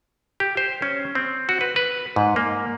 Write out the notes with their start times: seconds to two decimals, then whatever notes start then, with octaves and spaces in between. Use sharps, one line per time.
0.40 G4
0.57 C5
0.82 C#4
1.15 C4
1.49 F#4
1.61 B4
1.76 B4
2.16 G#2
2.36 A#3